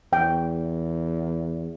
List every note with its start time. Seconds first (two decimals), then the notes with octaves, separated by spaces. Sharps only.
0.13 E2 G5